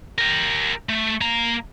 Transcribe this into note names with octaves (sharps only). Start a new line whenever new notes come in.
G4 A#4
A3
A#3 A#5